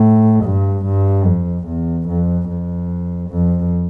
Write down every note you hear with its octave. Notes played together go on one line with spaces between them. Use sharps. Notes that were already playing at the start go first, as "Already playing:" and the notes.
Already playing: A2
G2
G2
F2
E2
F2
F2
F2